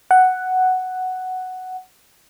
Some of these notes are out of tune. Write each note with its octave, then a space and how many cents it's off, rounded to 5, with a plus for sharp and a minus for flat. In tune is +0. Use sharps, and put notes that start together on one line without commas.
F#5 +5